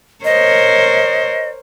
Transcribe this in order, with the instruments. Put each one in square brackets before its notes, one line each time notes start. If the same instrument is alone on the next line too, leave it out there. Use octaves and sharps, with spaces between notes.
[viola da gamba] A#4 C5 C#5 [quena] D#5